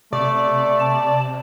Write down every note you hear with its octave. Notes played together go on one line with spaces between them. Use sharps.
C3 A3 D5
A5